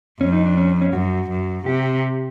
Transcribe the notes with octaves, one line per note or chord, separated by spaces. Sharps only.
F2 C#4
D#4
D4
C#4
C#4
F#2 F#4
F#2
C3 G4